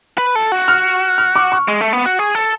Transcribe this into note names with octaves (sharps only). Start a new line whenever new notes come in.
B4
A4
F#4
F6
F6
D6
C#6
G#3
A3
B3
F#4
G#4
A4